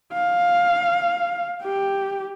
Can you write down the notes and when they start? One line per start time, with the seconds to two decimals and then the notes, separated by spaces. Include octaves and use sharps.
0.13 F5
1.63 G4